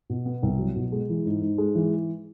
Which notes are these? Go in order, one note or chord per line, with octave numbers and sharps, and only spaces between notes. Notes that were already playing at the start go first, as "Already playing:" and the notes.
B2
B3
C2
F#3
B2
G#3
E3
G#2
G#2
G#3
E3